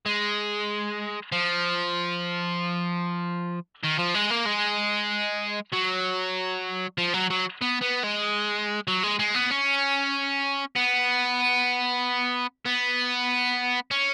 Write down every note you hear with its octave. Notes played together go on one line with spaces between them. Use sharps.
G#3
F3
D#3
F3
G#3
A#3
G#3
F#3
F3
F#3
F#3
B3
B3
G#3
F#3
G#3
G#3
B3
C#4
B3
B3
C#4